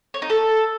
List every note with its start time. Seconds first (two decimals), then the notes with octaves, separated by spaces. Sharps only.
0.14 C#5
0.22 D#4
0.30 A4